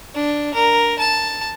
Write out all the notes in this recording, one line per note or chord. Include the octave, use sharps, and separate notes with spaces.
D4
A#4
A5